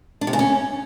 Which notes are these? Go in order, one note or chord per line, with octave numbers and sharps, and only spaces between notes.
D4
C3
C#3
C#4